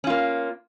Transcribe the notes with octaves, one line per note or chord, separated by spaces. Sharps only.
A#3 C#4 F4